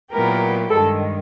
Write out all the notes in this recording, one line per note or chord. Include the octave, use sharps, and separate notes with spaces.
A#2 F#3 B3 E4 G4 A#4
G2 D#3 G#3 A4